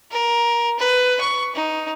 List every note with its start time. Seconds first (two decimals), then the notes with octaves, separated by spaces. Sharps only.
0.11 A#4
0.79 B4
1.20 C#6
1.55 D#4